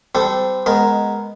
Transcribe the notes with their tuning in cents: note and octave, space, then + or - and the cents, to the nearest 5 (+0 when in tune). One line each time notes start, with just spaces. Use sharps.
G3 +0 C4 -25 A4 +0
G#3 +0 B3 +0 A#4 +0